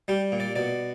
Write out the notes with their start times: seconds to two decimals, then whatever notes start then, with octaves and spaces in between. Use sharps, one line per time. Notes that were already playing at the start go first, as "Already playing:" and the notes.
0.08 G3 G4
0.32 A#2
0.40 D5
0.56 B2 D5